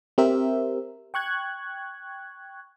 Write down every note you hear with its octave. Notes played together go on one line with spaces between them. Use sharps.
C4 G4 A#4 C5 E5
G5 C#6 F#6 G#6